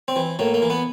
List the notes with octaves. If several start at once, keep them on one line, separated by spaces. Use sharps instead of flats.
C4
E3
A2 A#3
A#3
E3
B3